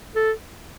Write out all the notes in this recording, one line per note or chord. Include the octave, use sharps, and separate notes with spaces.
A4